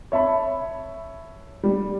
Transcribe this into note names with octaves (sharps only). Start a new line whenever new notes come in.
C#5 E5 A5 B5
G3